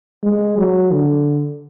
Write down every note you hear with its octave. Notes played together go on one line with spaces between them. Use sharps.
G#3
F#3
D3